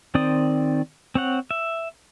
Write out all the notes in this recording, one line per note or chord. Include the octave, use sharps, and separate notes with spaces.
D#3 C4 C5 D5 D#6
C4 C#5 F#5
E5